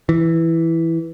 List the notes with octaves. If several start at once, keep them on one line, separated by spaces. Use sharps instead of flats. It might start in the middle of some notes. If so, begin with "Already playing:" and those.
E3